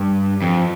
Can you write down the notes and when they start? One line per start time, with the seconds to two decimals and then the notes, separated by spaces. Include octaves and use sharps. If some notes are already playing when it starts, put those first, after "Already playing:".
Already playing: G2
0.42 F2